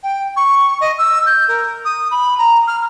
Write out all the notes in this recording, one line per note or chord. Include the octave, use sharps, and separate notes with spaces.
G5
C#6
D#5
E6
G6
A#4
D#6
B5
A#5
F6